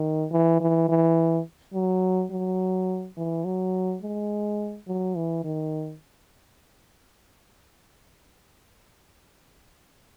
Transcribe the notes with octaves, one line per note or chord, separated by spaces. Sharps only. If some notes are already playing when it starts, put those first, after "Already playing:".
Already playing: D#3
E3
E3
E3
F#3
F#3
E3
F#3
G#3
F#3
E3
D#3